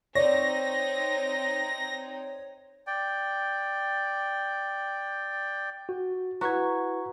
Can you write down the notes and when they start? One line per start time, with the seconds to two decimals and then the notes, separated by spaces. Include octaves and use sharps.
0.15 C4 D#4 C#5 D5 A#6
2.87 D5 G5
5.89 F#4
6.41 E4 F#4 B4 A#5 C#6 G#6